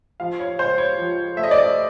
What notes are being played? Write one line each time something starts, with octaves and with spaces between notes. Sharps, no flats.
F3 F5
C#5
C#2 C5
C#5
F3
A3 E5
D#5
D5
D#5